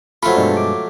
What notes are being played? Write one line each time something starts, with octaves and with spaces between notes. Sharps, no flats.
F3 F#3 A3 F4 A4 B5
G2 B2 G#3 D4
D6